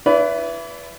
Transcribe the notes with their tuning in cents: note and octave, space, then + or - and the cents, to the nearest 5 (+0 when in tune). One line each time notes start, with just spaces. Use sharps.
E4 +20 B4 +5 D5 -35